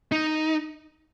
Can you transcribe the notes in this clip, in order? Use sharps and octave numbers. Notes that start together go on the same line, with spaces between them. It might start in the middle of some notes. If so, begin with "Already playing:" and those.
D#4